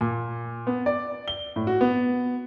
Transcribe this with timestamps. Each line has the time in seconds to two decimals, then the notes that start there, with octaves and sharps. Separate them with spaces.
0.01 A#2
0.67 B3
0.86 D5
1.28 G7
1.56 A2
1.67 F#4
1.81 B3